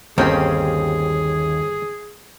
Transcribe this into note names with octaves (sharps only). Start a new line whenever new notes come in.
G1 D#2 C4 C#4 G4 G#4 A#4